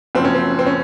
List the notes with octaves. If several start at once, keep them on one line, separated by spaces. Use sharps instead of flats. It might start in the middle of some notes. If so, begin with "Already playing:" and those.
F#1 F#2 F3 C4
C#4
C4
C4
C#4